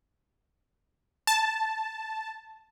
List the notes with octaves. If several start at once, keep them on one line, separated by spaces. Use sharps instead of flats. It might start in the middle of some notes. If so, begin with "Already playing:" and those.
A5